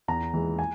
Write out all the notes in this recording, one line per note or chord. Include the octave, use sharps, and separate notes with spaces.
E2 A#5
E3 G#3
G#5